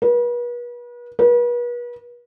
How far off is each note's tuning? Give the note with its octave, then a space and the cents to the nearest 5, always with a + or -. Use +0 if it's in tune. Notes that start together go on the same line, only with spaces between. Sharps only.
B4 -40
B4 -40